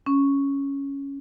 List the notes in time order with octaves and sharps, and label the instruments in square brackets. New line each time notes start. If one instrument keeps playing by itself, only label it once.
[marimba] C#4